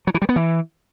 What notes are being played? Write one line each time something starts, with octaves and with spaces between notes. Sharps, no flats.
F#3
E3
G3
B3
E3